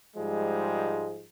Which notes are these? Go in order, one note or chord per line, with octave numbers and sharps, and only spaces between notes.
G#2 F3 G3 G#3